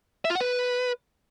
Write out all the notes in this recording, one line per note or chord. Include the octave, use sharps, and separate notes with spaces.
E5
F4
F#5
B4